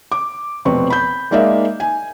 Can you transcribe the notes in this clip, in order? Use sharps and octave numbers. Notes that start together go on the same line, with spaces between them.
D6
F1 B2 C4 B4 C#6
B5 G6
G#3 A#3 D#4 D5 E5 F5
G#5